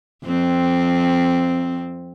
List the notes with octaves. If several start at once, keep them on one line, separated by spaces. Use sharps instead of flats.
F2 C4